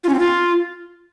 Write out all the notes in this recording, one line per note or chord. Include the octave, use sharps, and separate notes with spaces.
F4
C#4
C4
F4